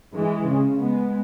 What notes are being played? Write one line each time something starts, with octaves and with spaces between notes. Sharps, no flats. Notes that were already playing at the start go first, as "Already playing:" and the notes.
E3 G#3
C#3
G#3 B3